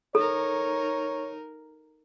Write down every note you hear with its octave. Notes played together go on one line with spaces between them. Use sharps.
D#4 A4 A#4 C#5